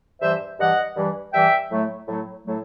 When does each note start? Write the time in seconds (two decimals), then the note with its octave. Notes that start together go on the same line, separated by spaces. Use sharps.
0.22 G2 E3 G3 C5 E5
0.59 G2 E3 G3 D#5 F#5
0.96 G2 E3 G3
1.33 G2 E3 G3 E5 G5
1.70 A2 F#3 A3
2.07 A2 F#3 A3
2.44 A2 F#3 A3